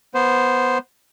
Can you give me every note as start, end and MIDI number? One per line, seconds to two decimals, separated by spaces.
0.14 0.78 59
0.14 0.78 72